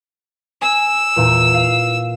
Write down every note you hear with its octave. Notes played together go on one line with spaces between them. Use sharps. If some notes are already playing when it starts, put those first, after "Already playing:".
G#5 E6
E2 A#2
F5